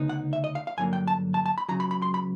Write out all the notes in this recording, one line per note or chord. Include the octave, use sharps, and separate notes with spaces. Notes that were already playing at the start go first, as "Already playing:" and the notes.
Already playing: D2 C#3 B3 D#4
F#5
E5
D#5
F5
F5
G2 D3 F#3 A#3 D4 G#5
G5
A5
A5
A5
B5
C#2 C#3 F#3 A#5
B5
B5
C6
B5